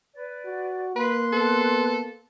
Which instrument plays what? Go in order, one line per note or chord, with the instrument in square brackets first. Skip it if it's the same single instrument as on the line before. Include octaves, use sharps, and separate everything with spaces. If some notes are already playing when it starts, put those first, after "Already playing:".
[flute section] B4 D5
[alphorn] F#4
[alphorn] A#3 [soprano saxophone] B4 [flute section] C6 F#6
[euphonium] B3 [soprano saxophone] A4